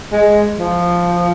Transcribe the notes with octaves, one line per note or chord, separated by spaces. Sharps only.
G#3
F3